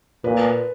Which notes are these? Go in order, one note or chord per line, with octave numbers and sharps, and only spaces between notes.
A#2 B4